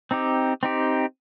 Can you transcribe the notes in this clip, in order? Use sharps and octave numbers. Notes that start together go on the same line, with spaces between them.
C4 D#4 G4
C4 D#4 G4